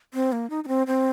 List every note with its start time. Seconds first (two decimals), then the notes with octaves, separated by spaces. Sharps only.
0.14 C4
0.32 A#3
0.50 D#4
0.64 D#4
0.68 C4
0.87 C4